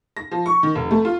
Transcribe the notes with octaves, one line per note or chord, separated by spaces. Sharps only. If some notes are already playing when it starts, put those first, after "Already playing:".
A#6
F3
C#6
D#3
F1
A3
F4